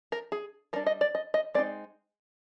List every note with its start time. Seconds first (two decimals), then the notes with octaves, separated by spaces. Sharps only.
0.12 A#4
0.32 G#4
0.73 G3 D4 A#4
0.86 D#5
1.01 D5
1.15 D#5
1.34 D#5
1.54 G#3 C4 D#4 D5